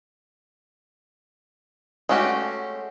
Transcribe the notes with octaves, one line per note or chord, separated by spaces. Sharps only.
G#3 A3 C#4 F#4 G4